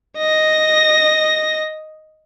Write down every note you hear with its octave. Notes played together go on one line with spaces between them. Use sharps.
D#5 A#6